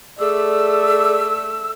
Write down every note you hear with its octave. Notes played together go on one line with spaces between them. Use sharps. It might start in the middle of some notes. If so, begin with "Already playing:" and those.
A3 G#4 D5 E6